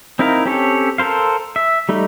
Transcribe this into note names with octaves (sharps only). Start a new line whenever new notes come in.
C4 D#4 E4 A#4 F5
C4 C#4 G4 A4 C#5
A4 A#4 C5 F5
E5
G3 A3 D#4